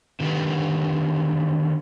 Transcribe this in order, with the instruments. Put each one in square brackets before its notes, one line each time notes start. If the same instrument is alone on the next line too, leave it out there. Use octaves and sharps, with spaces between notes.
[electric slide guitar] D3 D#3 A#3 E4 G4 B4